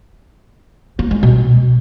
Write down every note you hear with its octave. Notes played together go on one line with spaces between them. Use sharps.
A#3
G#3
B2